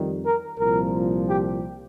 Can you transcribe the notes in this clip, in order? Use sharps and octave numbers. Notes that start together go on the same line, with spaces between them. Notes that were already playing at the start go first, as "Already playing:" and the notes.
Already playing: F2 D#3 G3
A#4
C2 A#2 F3 A#4
G4